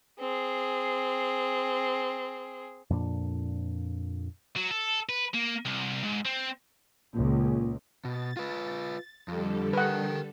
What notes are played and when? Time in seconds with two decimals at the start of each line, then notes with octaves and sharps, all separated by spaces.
0.19 C4 G#4
2.90 F2 A#2 D4
4.56 F#3
4.71 A4
5.09 B4
5.34 A#3
5.66 C2
6.04 G#2
6.26 C4
7.14 C#2 A#2
8.05 B2 A6
8.37 F4 B4
9.28 F2 D3 G3 A4
9.73 A#4 B4 F#5 G5